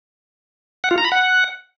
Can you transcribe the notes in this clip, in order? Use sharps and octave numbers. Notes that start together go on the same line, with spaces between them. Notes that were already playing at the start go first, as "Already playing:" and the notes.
F#5
F4
A#5
B5
F#5